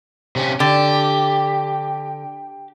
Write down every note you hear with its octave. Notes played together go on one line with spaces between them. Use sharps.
C3 C#4
D3 G4